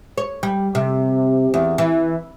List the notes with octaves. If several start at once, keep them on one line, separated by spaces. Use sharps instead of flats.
C#5
G3
C3
E2
E3